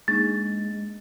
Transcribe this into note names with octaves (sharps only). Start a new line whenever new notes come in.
G#3 A#3 D4 D#4 A6